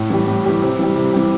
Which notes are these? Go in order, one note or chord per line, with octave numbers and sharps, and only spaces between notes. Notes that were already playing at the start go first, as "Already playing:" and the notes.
Already playing: A2
E3 G3
A2
E3 G3
C3
E3 G3
C3
E3 G3